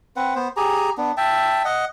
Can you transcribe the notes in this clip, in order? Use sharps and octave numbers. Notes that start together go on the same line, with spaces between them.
C4 B4 F#5
B3 C5
G4 G#4 G#5 A#5
B3 D4
E5 G5 A5
D#5 F#5